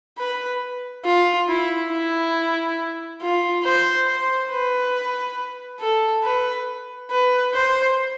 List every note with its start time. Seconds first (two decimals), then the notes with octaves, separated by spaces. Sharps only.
0.18 B4
1.05 F4
1.48 E4
1.92 E4
3.21 F4
3.64 C5
4.07 C5
4.51 B4
5.80 A4
6.23 B4
7.10 B4
7.54 C5